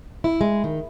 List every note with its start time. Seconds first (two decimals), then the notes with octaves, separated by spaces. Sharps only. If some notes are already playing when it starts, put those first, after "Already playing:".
0.24 E4
0.41 G#3
0.64 D#3